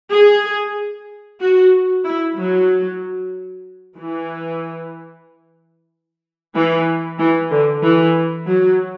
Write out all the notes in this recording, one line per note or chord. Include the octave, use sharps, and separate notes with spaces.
G#4
F#4
E4
F#3
E3
E3
E3
D3
E3
F#3